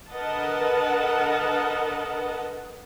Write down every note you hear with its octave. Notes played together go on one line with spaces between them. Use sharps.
D3 A#4 B4 D#5 F#5 A5